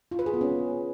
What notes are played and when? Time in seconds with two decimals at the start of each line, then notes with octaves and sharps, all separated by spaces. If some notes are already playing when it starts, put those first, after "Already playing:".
0.11 F4
0.19 B4
0.26 G#4
0.34 B3
0.41 C#4